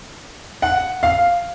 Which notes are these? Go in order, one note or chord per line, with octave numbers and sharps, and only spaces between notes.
F#5
F5